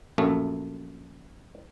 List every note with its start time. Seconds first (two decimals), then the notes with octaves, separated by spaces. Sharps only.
0.18 A#1 F#2 A3